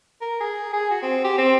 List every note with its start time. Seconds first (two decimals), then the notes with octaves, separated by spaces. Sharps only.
0.21 A#4
0.40 G#4
0.73 G#4
0.90 F#4
1.02 C4
1.24 G4
1.38 C4